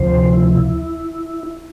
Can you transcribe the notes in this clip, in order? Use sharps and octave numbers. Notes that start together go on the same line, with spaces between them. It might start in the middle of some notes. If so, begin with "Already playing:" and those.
Already playing: D2 C3 F3 C5
E4